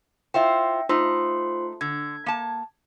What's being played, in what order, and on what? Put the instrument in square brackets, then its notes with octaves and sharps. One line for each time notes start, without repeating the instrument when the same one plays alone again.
[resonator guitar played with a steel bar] E4 F4 C5 [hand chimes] E5 G5
[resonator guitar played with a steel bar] A3 D#4 [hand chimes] F4 C5 C6
[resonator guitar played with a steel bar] D3 [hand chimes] G#6
[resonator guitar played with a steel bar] A#3 A5